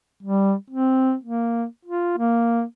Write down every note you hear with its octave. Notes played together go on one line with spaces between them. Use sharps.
G3
C4
A#3
F4
A#3